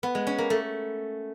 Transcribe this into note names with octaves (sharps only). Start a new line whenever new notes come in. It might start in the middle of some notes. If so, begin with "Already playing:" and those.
B3
G#3
C#4
A#3
A3